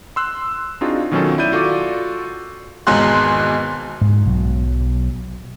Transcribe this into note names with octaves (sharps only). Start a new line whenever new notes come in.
C6 E6 F#6
C4 D4 D#4 F4 F#4 G#4
B2 D#3 F#3 C#4 F4 A4
E4 D5 G6 D#7
F4 F#4 A4 D5 D6
G#1 E2 B2 G#3 C6 F#6
G#2
B1 B2 F#3